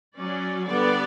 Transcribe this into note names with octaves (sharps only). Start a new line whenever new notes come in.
F#3 C#4 D5
D3 G3 B3 D5